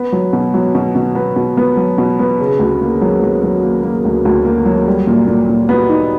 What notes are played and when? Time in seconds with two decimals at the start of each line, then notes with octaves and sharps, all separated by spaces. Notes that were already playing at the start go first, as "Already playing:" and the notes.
Already playing: B3
0.12 F#3
0.33 B2
0.54 F#3
0.75 B2
0.95 B2
1.15 B3
1.36 B2
1.57 B3
1.77 F#3
1.98 B2
2.19 B3
2.40 C#3
2.59 D2
2.81 A#3
3.02 F#3
3.22 F#3
3.43 F#3
3.63 A#3
3.83 A#3
4.05 D2
4.25 D2
4.45 A#3
4.66 F#3
4.87 G3
5.07 A#2
5.28 A#2
5.49 A#2
5.69 B3
5.89 D#4